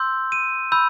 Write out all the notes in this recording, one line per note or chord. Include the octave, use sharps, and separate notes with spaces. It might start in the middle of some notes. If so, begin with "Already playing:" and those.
Already playing: C6 E6 G6
D#7
B5 E6 G6